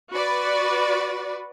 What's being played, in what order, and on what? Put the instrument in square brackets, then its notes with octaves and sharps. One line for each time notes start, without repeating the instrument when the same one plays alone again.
[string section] F#4 B4 D5